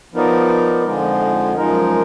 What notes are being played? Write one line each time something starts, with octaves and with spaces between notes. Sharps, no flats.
F3 B3 D#4 A#4 D5
F2 D3 F3 G#3 D#4
F#2 F3 G#3 D#4 A#4